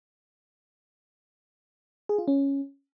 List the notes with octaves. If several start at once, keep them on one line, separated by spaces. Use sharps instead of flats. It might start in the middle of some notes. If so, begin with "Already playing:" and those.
G#4
F4
C#4